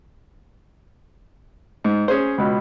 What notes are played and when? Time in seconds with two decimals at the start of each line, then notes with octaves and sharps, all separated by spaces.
1.84 G#2
2.08 C#4 G#4 C5
2.38 C#2 B2